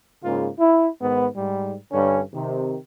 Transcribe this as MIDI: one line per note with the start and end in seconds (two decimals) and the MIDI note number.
0.24 0.50 44
0.24 0.50 49
0.24 0.50 58
0.24 0.50 65
0.59 0.89 64
1.02 1.28 44
1.02 1.28 51
1.02 1.28 59
1.36 1.75 44
1.36 1.75 55
1.92 2.21 43
1.92 2.21 50
1.92 2.21 61
2.34 2.77 48
2.34 2.77 51